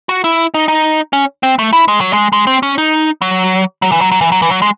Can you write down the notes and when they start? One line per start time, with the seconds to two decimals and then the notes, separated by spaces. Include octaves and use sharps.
0.09 F#4
0.24 E4
0.54 D#4
0.68 D#4
1.13 C#4
1.43 C4
1.59 A3
1.73 E4
1.88 G#3
2.01 F#3
2.13 G#3
2.33 G#3
2.47 C4
2.63 C#4
2.78 D#4
3.22 F#3
3.82 F#3
3.92 E3
4.01 F#3
4.11 F#3
4.21 E3
4.32 F#3
4.42 E3
4.51 F#3
4.62 G#3